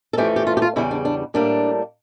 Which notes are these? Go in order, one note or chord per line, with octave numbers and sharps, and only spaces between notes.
A4
F2 E3 A3 C#4 G4
G4
F4
G4
F4
E2 C#3 G3 E4
D4
D4
A2 G3 A#3 D4